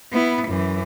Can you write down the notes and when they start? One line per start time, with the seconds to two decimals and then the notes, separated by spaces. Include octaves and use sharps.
0.12 B3 E4
0.48 F#2 E3